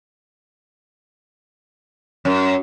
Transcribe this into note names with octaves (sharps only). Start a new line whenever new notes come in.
F#2